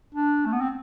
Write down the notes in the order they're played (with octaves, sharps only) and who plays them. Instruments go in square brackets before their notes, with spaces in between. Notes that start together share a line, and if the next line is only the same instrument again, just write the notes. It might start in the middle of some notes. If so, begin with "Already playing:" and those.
[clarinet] D4
A3
B3
C4